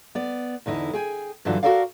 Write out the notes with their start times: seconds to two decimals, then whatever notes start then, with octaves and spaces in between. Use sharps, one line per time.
0.15 B3 D5
0.66 E2 D3 D#4 E4
0.93 G#4 G5 G#5
1.45 G2 D3 E3 F#3 D4 F4
1.63 F#4 G4 A4 A#4 D5 F5